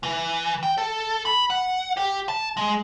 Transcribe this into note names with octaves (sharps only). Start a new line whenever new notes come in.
E3
G5
A4
B5
F#5
G4
A5
G#3